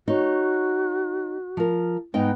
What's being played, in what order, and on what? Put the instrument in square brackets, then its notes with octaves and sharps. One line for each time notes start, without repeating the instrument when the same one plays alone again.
[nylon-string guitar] D#4 C#5 [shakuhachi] F#4
[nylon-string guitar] F3 A#4
[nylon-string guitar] G#2 D#4 G5 [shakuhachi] B3